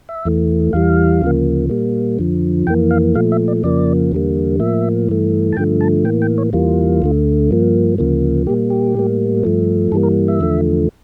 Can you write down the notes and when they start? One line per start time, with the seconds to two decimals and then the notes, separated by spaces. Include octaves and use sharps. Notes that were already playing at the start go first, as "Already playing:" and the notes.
0.09 E5
0.25 E2 E3 A3
0.73 E2 E3 G3 F5
1.22 D2 C#3 F3 A#3
1.70 A#2 G3 A#3
2.19 F2 D3 F3
2.67 F2 E3 A#3 G5
2.91 F5
3.15 A#2 F3 A3 F5
3.32 E5
3.48 D5
3.63 F2 C#3 F3 A#3 D5
4.12 E2 D3 G3 A#3
4.60 A2 F3 A#3 E5
5.08 G2 E3 A3
5.52 A5
5.57 G2 D3 F3 A3 G5
5.81 A5
6.05 A2 E3 A#3 G5
6.22 G5
6.38 C#5
6.53 E2 E3 G3 A#3 F4
7.02 D2 D3 A3
7.51 G2 F3 A#3
7.98 D2 C#3 F3 A#3
8.47 A#2 G3 A#3 G4
8.70 G4
8.94 A2 G3 A#3
9.43 G2 F3 A3
9.92 G2 E3 G3 A#3 A4
10.03 A#4
10.28 E5
10.40 E2 D3 F3 A3